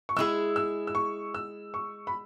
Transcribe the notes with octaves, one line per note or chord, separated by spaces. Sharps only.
C#6
G#3 E4 G#4 E6
E6
E6
C#6
E6
C#6
B5